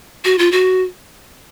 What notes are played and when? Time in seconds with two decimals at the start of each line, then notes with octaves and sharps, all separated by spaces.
0.25 F#4
0.39 F4
0.52 F#4